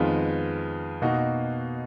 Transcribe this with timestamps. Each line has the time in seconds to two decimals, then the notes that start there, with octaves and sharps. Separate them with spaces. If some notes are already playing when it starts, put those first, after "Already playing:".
Already playing: F2 D#3 G#3 B3 F4
1.02 B2 A#3 D#4 F#4